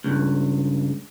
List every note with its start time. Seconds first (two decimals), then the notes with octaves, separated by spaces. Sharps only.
0.04 C#2 G2